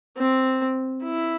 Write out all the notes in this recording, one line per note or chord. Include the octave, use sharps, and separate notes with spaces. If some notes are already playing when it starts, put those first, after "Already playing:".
C4
E4